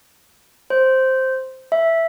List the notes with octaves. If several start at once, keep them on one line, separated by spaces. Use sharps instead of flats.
C5
E5